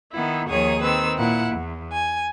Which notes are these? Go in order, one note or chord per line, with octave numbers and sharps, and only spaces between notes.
D#3 B3 E4
D#2 D#3 F3 G#4 C#5 D#6
D#3 C4 B4 E6
A#2 E4 F#5
E2
G#5